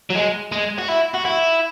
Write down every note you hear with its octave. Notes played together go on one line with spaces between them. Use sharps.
F#3
G#3
G#3
F#4
E4
F#4
E4